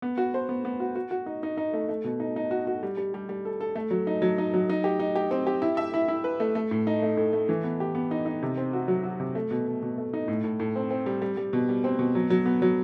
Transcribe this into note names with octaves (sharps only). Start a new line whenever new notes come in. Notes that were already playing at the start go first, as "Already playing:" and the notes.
B3
F#4
C5
B3
B3
F#4
F#4
F#4
D#4
D#4
D#4
A3
A3
B2
D#4
D#4
F#4
F#4
G3
G3
G3
G3
A4
A4
A3
F#3
D#4
F#3
D#4
F#3
D#4
G4
D#4
G4
C4
G4
E4
E5
E4
E4
B4
A3
A3
A2
D#4
A3
A2
A3
E3
B3
G4
B3
D#4
D#4
C3
C4
F#4
F#3
F#4
C3
A3
B2
B2
B2
A3
D#4
A2
A2
A2
C4
C4
G3
G3
G3
B2
G3
C4
B2
F#3
F#3
B3
F#3